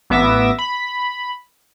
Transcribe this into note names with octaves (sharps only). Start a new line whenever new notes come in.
A1 B3 E5 D6 A#6 E7
B5